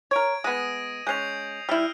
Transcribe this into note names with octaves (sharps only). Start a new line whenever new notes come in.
A#4 C#5 G#6 D7
G#3 B3 D#6 A#6 D#7
G#3 C#4 G6 C7 F7
G3 E4 E6 F6